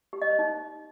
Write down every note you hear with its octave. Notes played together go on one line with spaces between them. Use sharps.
G4
D#5
C5
D#4